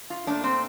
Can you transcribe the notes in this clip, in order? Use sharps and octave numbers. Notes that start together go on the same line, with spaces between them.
F4
A#2 A3 D4
C4